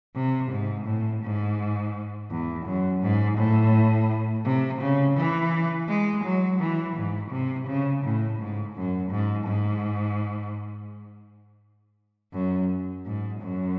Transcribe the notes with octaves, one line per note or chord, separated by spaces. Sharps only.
C3
G#2
A2
G#2
E2
F#2
G#2
A2
C3
C#3
E3
G#3
F#3
E3
G#2
C3
C#3
A2
G#2
F#2
G#2
G#2
F#2
G#2
F#2